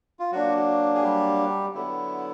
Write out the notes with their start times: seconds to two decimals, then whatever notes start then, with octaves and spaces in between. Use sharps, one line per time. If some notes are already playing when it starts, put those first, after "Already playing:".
0.19 F4
0.32 F#3 A#3 D4 F#4
0.95 G#4
1.02 G3 G4
1.74 D3 F#3 B3 E4